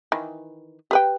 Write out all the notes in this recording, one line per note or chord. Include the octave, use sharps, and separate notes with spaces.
D#3 E3
G4 B4 G5